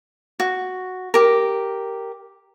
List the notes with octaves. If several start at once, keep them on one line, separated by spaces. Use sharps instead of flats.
F#4
G4 A#4